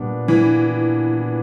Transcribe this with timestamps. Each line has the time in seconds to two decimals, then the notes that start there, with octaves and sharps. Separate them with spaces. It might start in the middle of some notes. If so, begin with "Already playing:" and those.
Already playing: A#2 G3 B3 D4
0.28 E3